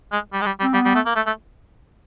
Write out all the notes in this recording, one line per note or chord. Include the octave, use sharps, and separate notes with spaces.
G#3
G3
G#3
G3
G3
C4
G3 B3
G3
A3
A#3
A3
A3